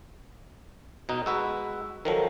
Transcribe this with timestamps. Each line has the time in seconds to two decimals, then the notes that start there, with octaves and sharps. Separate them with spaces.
1.09 B2 D#4
1.26 G#3 F#4 B4 E6
2.05 D#3 F3 F#3 A4 A#4